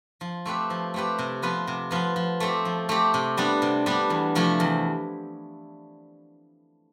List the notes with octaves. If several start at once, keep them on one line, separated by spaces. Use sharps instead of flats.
F3
A3 C4 G4 B4
F3
A3 C4 G4 B4
C3
F3 B3 F4 B4
C3
F3 B3 F4 B4
F3
A3 C4 G4
F3
A3 C4 G4
C3
G3 B3 D4
C3
G3 B3 D4
E2
C3 F3 A3 E4
E2